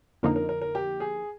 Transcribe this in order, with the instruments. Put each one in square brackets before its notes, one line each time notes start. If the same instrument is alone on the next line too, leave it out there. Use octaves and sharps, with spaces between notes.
[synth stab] F2 D3 F3 A#3 D#4 [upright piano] A#4
[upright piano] A#4
A#4
A#4
G4
G#4